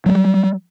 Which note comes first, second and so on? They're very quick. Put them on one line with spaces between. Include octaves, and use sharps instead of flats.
F#3 A3 G3